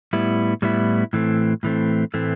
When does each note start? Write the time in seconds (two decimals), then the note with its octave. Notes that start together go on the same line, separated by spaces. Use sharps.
0.13 A2 G3 B3 E4
0.62 A2 G3 B3 E4
1.13 A2 E3 A3 C4
1.63 A2 E3 A3 C4
2.14 A2 E3 A3 C4